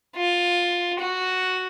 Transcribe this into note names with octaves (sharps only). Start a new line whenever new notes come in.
F4
F#4